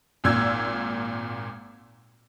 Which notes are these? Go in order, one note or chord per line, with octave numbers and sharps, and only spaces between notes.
G#1 A#2 E6 G#6